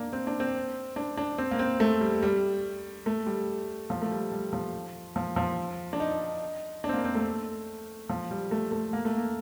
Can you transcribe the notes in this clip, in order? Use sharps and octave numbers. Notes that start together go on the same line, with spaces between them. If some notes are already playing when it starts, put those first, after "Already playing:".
Already playing: A#3 D4
C4
D4
C4
D4
D4
C4
A#3
C4
A3
G3
G3
A3
G3
F3
A3
G3
G3
F3
F3
F3
D4
D#4
D4
C4
A#3
C4
A3
F3
G3
A3
A3
A#3
A3
A#3